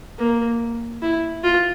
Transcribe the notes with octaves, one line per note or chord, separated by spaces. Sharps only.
A#3
E4
F4